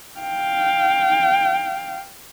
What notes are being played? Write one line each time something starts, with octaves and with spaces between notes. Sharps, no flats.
F5 G5